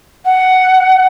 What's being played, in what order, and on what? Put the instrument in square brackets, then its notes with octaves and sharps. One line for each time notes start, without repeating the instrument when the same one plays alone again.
[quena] F#5